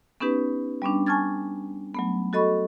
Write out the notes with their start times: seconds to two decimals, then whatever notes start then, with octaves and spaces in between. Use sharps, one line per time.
0.20 B3 C#4 D#4 G4 B4
0.82 G3 B3 C#4 D4
1.06 G#5 A5 C#6 F6 G#6 A6
1.94 F#3 A3 B3
2.33 F#4 A4 D#5 B5 C#6